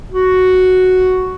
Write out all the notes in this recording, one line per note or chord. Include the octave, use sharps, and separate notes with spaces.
F#4